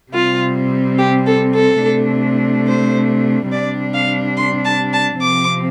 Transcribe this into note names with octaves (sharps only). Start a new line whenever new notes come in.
C3 G3 C4 F4
G4
A4
A4
C3 A3 D4
C5
C3 G3 D4 D5
F5
C6
A5
A5
C3 F3 C4 D6